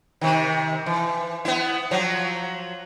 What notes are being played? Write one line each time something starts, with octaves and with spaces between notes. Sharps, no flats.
C3 D#3
E3
B3 E4
F3 F#3